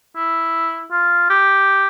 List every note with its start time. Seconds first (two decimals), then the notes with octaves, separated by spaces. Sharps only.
0.16 E4
0.92 F4
1.30 G4